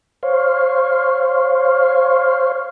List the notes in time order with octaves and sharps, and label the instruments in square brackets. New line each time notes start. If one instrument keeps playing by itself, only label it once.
[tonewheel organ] C5 C#5 F5